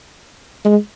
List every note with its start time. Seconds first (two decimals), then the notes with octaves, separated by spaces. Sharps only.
0.65 G#3